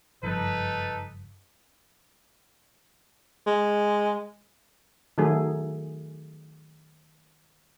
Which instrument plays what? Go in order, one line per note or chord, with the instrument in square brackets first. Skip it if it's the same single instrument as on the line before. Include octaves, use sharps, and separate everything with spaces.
[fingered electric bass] F#1 G2 F3 [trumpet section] D#4 A4 B4
[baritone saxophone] G#3
[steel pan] D#3 F#3 A3 G#4